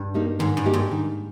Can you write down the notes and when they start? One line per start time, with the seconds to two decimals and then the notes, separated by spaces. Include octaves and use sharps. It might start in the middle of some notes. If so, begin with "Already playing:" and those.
Already playing: G2
0.14 A#3 D#4 G4
0.39 G#2 D#3
0.57 G2
0.66 A#3 D#4 G4
0.73 G#2
0.91 D#3